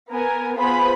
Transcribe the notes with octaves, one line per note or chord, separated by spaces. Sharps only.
B3 A#4 G#5
B3 F4 G#4 C5 B5